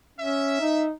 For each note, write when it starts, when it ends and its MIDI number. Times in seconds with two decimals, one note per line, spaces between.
0.18 0.56 61
0.18 0.85 76
0.61 0.90 63